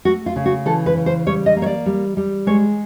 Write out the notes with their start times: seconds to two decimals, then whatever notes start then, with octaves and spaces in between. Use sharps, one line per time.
0.05 A3 F#4
0.26 F4
0.36 C#3
0.46 F#4
0.66 E3 A4
0.86 B4
0.96 C#3
1.06 C5
1.26 G3 C#5
1.46 D#5
1.57 A#3
1.62 C#5
1.66 D5
1.86 G3
2.17 G3
2.46 G#3 C#5